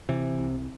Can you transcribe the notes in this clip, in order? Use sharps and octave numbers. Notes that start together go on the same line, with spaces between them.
C3 E3
C2